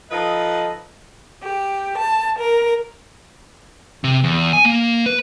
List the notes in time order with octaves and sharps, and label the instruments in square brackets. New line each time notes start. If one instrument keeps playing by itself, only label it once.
[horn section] F3 D#4 A4 B4 D#5
[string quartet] G4
A5
A#4
[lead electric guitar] C3
E2
G#5
A#3
B4